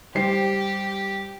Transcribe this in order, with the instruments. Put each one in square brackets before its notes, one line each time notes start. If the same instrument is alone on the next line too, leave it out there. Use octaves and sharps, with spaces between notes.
[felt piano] G3 C5 C7 [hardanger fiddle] G4